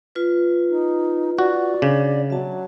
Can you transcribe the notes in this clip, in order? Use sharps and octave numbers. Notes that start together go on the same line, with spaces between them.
F4 B4
D#4
F#4 D5
C#3 D4
F#3 E5 A5